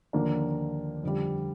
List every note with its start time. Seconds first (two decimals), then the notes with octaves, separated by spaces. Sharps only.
0.13 D#2 D3 F3 A#3 D4
1.03 F2 D3 G3